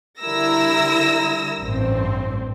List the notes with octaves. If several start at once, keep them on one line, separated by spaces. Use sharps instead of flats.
D3 G3 E4 A#4 E6 A#6
A1 G2 C4